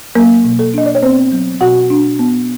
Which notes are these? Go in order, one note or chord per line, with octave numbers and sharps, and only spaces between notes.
F#3 A#3 A#4
B2
A4
D4 D#5
D5
C#5
B3 C4 C5
F#3
B2 F#4 F#5
D4
B3